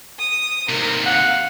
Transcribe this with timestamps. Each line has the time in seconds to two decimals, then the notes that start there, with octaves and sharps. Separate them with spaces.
0.19 D#6
0.69 D#2 C3 A#4
1.06 F5 F#5